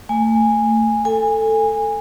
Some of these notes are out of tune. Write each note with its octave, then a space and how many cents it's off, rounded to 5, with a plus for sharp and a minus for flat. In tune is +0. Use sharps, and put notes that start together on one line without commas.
A3 +30 G#5 -10
A4 +10 G#5 -20